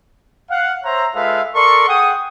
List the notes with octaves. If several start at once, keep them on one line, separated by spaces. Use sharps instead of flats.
F5 F#5
C5 C#5 E5 A#5
G#3 F4 A4 B4 E5 F5
A4 A#4 D5 C6 C#6
G#4 F#5 G5 D#6